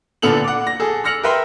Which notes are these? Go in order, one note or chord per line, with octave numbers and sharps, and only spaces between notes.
A#2 D3 B3 A4 F7 F#7
F#5 D6
A#6
G#4 A4
E6 F6 A#6 C#7 F7 F#7
A#4 B4 E5 G5 C6